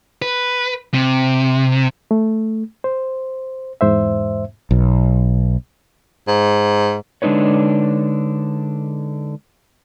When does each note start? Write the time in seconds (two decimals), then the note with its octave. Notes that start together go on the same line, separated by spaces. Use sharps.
0.22 B4
0.94 C3
2.11 A3
2.84 C5
3.81 E2 G#2 C5 E5
4.71 B1
6.28 G#2
7.22 D3 G#3 D4 D#4 B4 C#5